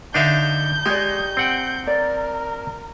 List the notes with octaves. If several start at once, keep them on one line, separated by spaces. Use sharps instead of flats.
D3 D4 D#4 A4 E5 F5 G6
G#3 D#4 G4 D5 C#6
C4 F#5 G5
A#4 D5